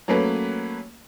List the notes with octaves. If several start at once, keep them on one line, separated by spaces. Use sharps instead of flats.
F#3 A3 A#3 C#4 B4